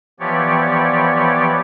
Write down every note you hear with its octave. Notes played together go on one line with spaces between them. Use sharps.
E3 F3 B3 G4 C#5 D5